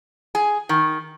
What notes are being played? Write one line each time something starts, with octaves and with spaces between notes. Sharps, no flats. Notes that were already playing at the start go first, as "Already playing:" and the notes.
G#4
D#3